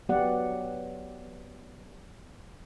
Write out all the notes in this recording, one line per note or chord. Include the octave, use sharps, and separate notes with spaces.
F#3 B3 G4 D5 F#5